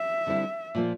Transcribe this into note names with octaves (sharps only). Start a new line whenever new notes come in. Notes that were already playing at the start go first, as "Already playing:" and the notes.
Already playing: E5
D3 G3 C4 E4
A#2 F3 A#3